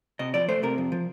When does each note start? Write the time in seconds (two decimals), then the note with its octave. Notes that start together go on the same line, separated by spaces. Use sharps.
0.19 C3 D#5
0.34 F3 D5
0.49 A3 C5
0.63 C3 A#4
0.78 F2
0.92 F3